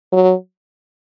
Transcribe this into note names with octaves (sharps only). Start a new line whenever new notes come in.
F#3